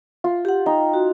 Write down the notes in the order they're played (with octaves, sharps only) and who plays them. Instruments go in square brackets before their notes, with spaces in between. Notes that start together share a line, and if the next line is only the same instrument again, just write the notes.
[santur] F4
[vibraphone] G4 F#5
[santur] D#4 [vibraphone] G5
[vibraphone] F#4